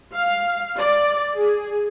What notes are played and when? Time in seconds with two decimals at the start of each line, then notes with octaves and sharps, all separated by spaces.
0.15 F5
0.78 D5
1.35 G#4